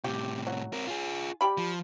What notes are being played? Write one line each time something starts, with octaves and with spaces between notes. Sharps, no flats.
A2 C3 G4
F#3
C4 A#4
F4 G#4
G3 G4 B5
F3